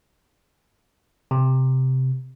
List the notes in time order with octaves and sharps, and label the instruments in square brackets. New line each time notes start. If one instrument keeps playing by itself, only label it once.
[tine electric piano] C3